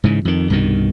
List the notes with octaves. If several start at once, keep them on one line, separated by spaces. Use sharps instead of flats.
G#2 C#3 E3
F2 D#3
C2 G2 B2 D#3